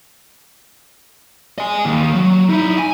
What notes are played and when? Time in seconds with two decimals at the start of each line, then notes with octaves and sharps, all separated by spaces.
1.58 D#5 G#5
1.85 D#3 A#3
2.15 F#3
2.50 D#4 E4
2.79 G#5